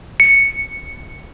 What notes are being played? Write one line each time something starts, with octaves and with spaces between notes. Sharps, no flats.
C#7